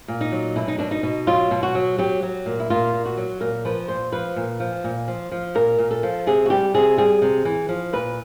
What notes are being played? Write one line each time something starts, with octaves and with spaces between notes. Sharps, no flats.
A#2
D#4
F#3
B2 E4
D#4
B2 D4
D#4
B2
F#3 F4
B2
F#4
F#3
F#3 G4
F#3
A#2
E4
A#2 F4
A#2
F#4
F#3
A#2 A#4
F3 B4
A#2 C5
F3 B4
A#2
F3
A#2
F3
F3
A#2 A#4
A#2
A4
F3
C3 G#4
F#4
G3 G4
C3 G#4
G3 G#4
C3
E3
F3
A#2 B4